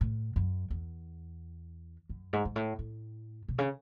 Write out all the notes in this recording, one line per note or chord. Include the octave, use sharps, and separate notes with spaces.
A2
F#2
E2
F#2
G#2
G#2
A2
A2
B2
C#3